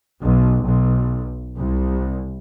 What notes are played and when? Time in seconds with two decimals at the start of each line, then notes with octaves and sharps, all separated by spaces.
0.21 B1
0.63 B1
1.56 C2